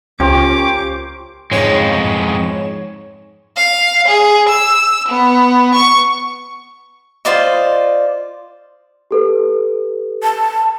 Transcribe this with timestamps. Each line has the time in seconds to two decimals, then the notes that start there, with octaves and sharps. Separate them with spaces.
0.20 C#2 C#4 F4 G4 A#4 C5 C#5 D6
1.51 F2 G#2 G#3 C#5 E7
3.57 F5
4.08 G#4
4.49 E6
5.08 B3
5.74 C#6
7.25 F4 C5 D5 D#5
9.11 G4 A4 B4
10.23 A5